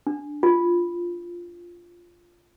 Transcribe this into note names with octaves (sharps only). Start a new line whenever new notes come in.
D4
F4